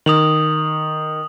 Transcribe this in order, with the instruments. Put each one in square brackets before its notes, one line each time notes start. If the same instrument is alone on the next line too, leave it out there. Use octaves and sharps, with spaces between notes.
[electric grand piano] D#3 [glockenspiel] D#6 F7 F#7